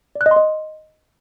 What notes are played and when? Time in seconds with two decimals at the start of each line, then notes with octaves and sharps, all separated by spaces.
0.15 D5
0.21 F#6
0.26 D#5
0.31 C6
0.36 D#5